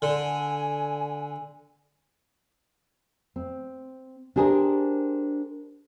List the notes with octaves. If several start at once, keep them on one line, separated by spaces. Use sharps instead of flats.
D3 G#5
C4
D4 G4 G#4 A#4 C5